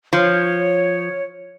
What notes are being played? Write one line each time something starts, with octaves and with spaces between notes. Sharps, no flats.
F3 C#5